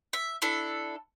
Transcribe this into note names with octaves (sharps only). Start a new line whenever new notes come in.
E5
D4 E4 A4